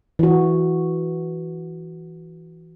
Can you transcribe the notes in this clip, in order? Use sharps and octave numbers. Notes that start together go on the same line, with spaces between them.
E3 F#4